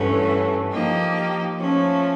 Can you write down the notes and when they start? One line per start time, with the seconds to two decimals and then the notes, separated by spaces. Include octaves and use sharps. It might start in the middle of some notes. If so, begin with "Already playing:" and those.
Already playing: G2 E3 A3 C#4 F#4
0.71 F3 A#3 D#4 G4
1.58 F3 A3 C#4